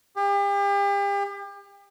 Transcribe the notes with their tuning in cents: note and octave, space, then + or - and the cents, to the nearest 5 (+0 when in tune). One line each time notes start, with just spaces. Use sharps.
G4 +40